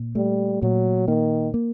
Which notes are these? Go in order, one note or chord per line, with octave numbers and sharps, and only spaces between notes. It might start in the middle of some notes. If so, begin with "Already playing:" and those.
Already playing: A#2
G3 A3
A#2 F#3
D#3 A#3
A#3